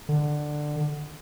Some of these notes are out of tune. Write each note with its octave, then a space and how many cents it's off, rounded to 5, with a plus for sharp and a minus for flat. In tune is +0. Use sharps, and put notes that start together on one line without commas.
D3 +15